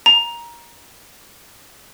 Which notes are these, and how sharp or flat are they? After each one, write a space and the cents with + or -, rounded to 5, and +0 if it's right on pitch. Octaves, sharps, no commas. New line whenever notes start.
A#5 +15